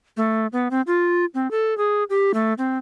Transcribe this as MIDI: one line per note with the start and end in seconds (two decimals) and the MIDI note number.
0.17 0.47 57
0.53 0.68 59
0.71 0.81 60
0.87 1.25 65
1.34 1.50 60
1.51 1.77 69
1.78 2.04 68
2.10 2.32 67
2.34 2.53 57
2.58 2.78 60